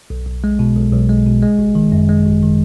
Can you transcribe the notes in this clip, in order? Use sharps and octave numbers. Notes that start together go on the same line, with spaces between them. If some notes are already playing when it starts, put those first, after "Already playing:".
B1
B1
G#3
B2
B1
B1
G#3
B2
G#3
G#1
D#3
F#2
G#3
G#1
D#3